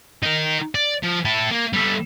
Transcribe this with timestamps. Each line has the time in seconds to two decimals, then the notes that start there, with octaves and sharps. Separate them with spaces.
0.23 D#4 A#4
0.75 D5
1.03 F3
1.25 E4 A4
1.52 A#3
1.73 G3 A4